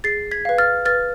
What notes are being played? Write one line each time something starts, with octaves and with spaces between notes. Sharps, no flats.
G#4 A6 C7
G#6 B6
B4 F5
F6 A6
B4 F6 A6